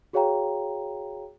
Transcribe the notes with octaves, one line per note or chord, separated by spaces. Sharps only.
F#4 G#4 C#5 F5 G5 A#5